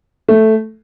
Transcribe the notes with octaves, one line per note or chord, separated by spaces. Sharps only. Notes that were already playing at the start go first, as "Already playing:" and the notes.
A3